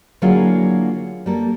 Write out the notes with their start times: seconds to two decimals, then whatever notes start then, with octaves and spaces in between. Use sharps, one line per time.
0.22 D3 F#3 A#3 E4 F4 G#4
1.26 G3 A#3 A4